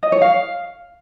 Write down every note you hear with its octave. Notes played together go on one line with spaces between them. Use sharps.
D#5
C#5
F5